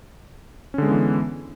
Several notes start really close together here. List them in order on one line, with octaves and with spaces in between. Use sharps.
C#4 D3 G#3 B3 E3